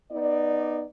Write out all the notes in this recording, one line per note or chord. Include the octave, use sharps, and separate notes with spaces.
B3 D#4 D5